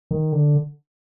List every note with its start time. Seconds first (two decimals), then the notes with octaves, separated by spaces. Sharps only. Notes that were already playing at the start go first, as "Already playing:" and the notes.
0.11 D#3
0.32 D3